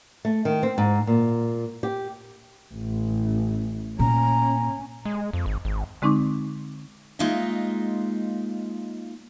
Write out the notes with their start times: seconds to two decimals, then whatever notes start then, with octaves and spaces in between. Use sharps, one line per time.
0.25 A3
0.45 D#3
0.63 C4
0.78 G#2
1.07 A#2
1.83 G4
2.74 A1
3.99 A#2 C#4 A#5
5.05 G#3
5.33 F2
5.46 G#1
5.65 G#1
6.02 D3 G#3 C4 D#4 C#6 D6
7.19 G#3 A#3 D#4 F4 D#5 E5